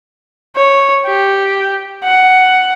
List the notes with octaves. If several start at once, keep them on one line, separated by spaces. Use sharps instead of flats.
C#5
G4
F#5